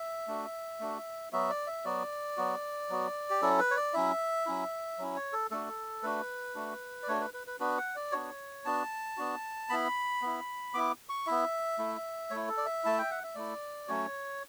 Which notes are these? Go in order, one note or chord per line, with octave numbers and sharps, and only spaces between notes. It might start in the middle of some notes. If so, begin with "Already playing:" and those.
Already playing: E5
A3 D4 F#4
A3 D4 F#4
F#3 B3 F#4 E5
D5
E5
F#3 B3 F#4 D5
F#3 B3 F#4
F#3 B3 F#4
G4
F#3 C#4 E4 A4
B4
C#5
D5
F#3 C#4 E4 E5
F#3 C#4 E4
F#3 C#4 E4
C#5
A4
A3 D4 F#4 A4
A3 D4 F#4 B4
A3 D4 F#4
D5
A3 D4 F#4 C#5
B4
B4
B4
B3 D4 F#4 B4
F#5
D5
B3 D4 F#4 C#5
B3 D4 F#4 A5
B3 D4 F#4
B3 E4 B5
B3 E4
B3 E4 D6
C#6
B3 E4 E5
A3 E4
A3 E4 C#5
A4
D5
E5
A3 E4 A5
G5
F#5
E5
A3 E4 D5
F#3 A3 C#4 F#4 C#5